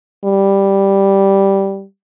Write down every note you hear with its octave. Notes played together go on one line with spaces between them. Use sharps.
G3